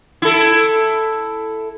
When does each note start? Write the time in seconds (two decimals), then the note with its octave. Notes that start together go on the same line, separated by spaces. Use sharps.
0.22 E4 A4